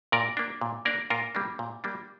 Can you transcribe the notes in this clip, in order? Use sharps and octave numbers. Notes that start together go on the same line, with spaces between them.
A#2 A#4 D5
A#3 D4
A#2
A#3 D4 A#4 D5
A#2 F4 A#4
G3 A#3 D4
A#2
G3 A#3 D4